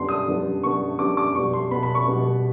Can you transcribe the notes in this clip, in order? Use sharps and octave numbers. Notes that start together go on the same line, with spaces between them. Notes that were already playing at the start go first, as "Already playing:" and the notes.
Already playing: F#2 D3 G3 B3 C6
D#6
F#2 D3 G3 B3
F#2 D3 G3 B3 C#6
F#2 D3 G3 B3 D6
D6
B2 G3 B3 C#6
C6
B2 G3 B3 B5
B5
C#6
B2 G3 B3